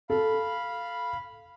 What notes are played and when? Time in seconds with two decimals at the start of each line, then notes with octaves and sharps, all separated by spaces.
0.10 A4 F5 B5